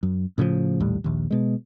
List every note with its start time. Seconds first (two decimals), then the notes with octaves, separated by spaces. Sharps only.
0.03 F#2
0.38 A2 C#3 E3 F3
0.80 A#1 D#2 A2 G3
1.04 A#1 D#2
1.31 B2 G#3